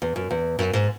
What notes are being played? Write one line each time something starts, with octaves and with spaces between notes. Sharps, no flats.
E2
F#2
E2
F#2
G#2